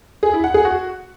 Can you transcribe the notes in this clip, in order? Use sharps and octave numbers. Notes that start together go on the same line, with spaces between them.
G#4
E4
F#5
G#4
F#4